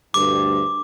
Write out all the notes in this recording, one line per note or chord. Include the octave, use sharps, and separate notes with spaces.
D2 G2 D6